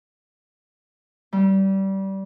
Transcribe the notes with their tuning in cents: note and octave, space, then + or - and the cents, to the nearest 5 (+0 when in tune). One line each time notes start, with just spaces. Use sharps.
G3 -20